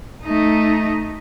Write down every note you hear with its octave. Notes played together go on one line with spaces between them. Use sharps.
A3 D#4